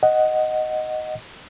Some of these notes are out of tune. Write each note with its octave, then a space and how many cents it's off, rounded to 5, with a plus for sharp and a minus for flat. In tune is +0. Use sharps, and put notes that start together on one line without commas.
D#5 +0 F#5 +5